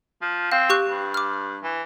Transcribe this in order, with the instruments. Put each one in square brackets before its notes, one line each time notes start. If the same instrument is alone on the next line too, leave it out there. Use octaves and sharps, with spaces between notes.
[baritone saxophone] F3
[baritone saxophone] C4 [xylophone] F5
[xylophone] G4 C#6 F#6
[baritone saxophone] G2
[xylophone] D6 F6
[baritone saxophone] E3